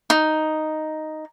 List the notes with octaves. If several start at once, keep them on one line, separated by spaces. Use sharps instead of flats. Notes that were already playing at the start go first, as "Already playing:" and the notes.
D#4